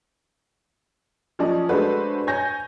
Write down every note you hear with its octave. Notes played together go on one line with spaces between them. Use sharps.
F3 C#4 D5 D#5
G#3 A3 D4 F#4 B4 C5
C#5 G#5 G6 A#6